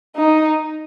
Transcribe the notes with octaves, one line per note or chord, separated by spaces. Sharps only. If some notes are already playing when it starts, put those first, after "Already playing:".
D#4